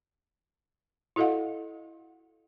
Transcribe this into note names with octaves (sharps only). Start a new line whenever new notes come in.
E4 F#4 A4 D#5 F5 F#5